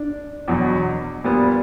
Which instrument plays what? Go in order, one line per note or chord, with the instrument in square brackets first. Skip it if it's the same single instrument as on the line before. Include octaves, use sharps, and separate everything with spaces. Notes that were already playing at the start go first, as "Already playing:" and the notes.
Already playing: [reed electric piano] D4
[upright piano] E2 B2 F#3
A#2 G3 B3